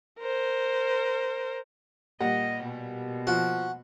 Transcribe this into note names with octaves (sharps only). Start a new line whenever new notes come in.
A#4 C5
A#2 G3 D#5 F#5
B2
F3 F#4